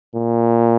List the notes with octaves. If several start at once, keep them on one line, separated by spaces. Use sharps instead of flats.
A#2